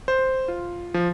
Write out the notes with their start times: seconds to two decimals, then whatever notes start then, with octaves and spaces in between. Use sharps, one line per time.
0.08 C5
0.48 F4
0.94 F3